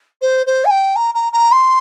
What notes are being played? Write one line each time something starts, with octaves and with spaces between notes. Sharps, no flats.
C5
C5
G#5
G5
A#5
A#5
A#5
C6